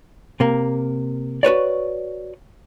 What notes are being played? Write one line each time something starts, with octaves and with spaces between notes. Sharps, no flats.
C3 A#3
F#4 B4 C#5 D5